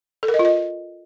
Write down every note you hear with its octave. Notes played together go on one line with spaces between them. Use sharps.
A4
A#4
D#5
F4
D#5